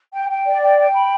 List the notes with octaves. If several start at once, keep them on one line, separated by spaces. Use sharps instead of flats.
G5
G5
D5
G5
G5
B5